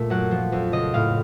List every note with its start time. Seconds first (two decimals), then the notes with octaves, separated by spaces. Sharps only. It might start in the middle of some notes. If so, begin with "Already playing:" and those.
Already playing: A#2 A3
0.10 F#2 F#5
0.31 F3
0.52 F2
0.72 C#3 D#5
0.94 A2 F5